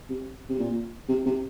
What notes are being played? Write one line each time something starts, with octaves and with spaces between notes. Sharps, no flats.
C3
C3
A#2
C3
C3